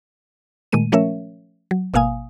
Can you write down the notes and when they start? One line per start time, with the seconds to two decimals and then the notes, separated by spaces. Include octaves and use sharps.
0.72 A#2 D#3 G#3 A3 D#7
0.92 F3 A3 C#4 A#4 C#5 E5
1.71 F#3
1.94 G#1 B2 A#3 F5 G#5 D#6